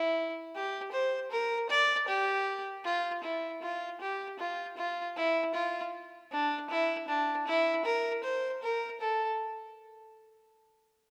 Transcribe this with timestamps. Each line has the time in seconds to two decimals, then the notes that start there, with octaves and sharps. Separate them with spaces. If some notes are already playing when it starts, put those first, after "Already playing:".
Already playing: E4
0.54 G4
0.92 C5
1.31 A#4
1.69 D5
2.08 G4
2.84 F4
3.23 E4
3.62 F4
4.01 G4
4.39 F4
4.77 F4
5.16 E4
5.54 F4
6.31 D4
6.70 E4
7.08 D4
7.47 E4
7.85 A#4
8.23 C5
8.63 A#4
9.00 A4